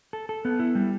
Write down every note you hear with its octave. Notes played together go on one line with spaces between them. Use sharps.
A4
A4
B3
E4
G3